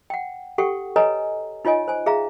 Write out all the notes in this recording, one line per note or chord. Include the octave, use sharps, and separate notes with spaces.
F#5 G5
G4 A4 F#5 G5 C#6
A4 B4 C#5 D#5 G#5 A#5
D#4 F4 C#5 D#5 G#5
C5 G#5
G#4 E5 F5 A#5